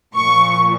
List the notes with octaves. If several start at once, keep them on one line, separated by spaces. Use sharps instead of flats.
A#2 F3 C#6